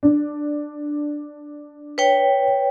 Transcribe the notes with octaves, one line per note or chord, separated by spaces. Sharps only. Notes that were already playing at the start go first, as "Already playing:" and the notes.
D4
B4 C#5 G5